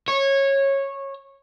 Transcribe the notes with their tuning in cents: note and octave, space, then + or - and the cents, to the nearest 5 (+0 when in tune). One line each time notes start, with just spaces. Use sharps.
C#5 -15